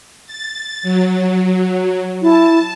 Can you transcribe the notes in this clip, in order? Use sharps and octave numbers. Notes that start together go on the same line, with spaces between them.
A6
F#3
E4 A5